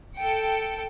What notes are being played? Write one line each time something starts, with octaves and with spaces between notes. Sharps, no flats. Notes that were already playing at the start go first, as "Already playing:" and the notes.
A4 G5 C#7